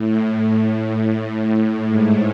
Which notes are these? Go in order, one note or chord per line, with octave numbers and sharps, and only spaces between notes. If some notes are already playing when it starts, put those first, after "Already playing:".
Already playing: A2
A2
G#2